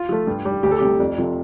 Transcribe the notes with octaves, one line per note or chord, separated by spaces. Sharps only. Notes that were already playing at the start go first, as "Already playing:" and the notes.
Already playing: F4
F3 A3
G2
G3
D2 G4
A4
C3 G3 G4
F2 D5
C3 F3 A3